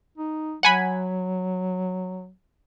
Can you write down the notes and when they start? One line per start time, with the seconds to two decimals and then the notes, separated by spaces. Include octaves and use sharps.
0.18 D#4
0.63 F#3 F#5 G#5 B5